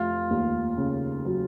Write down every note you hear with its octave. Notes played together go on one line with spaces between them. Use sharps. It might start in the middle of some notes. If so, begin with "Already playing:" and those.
Already playing: F1 F4
D#2
C#3
F#3